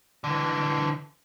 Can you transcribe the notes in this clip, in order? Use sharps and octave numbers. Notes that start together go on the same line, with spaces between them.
D3 E3